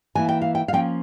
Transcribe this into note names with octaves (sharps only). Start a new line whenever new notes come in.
E3 A#3 E4 G#5
G5
F5
G5
F5
F3 A#3 C#4 F4 G5